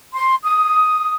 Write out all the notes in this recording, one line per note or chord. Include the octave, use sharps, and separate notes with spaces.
C6
D#6